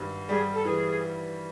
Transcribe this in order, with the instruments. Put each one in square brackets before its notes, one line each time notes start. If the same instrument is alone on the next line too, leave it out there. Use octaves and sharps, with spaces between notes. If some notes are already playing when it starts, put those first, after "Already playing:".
Already playing: [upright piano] G#1 G2
[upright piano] G3 [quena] G#4
[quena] A4
[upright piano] E3 [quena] G#4